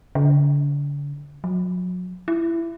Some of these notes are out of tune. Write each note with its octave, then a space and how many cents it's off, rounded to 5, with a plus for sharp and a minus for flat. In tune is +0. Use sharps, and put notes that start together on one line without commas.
D3 -40
F#3 -35
E4 +20